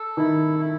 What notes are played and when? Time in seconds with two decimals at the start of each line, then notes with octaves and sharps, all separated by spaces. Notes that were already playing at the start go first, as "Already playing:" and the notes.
Already playing: A4
0.17 D#3 E4
0.59 E4